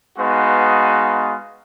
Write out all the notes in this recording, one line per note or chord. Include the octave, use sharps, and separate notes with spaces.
G#3 B3 D#4 F#4 B4 F5